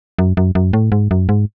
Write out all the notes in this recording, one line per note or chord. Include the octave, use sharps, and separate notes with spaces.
F#2
F#2
F#2
A2
G#2
F#2
G#2